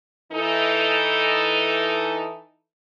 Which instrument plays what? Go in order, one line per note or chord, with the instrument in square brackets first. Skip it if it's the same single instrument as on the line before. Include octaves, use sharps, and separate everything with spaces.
[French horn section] E3 D#4 A4